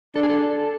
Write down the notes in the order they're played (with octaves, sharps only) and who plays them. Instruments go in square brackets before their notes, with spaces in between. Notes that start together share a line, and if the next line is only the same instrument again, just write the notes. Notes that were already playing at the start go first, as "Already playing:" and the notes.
[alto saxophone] D4 [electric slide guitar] A4
[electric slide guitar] G#4
A4